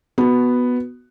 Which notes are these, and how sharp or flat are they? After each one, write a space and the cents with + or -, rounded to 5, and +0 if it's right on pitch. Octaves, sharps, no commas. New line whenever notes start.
B3 +0 F#4 +0